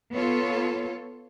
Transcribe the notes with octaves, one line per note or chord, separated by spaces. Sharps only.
B3 F4 A4 C#5